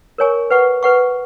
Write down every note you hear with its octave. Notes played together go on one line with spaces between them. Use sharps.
A#4 C#5 G#5 C#6
B4 F#5 C#6
B4 F#5 C#6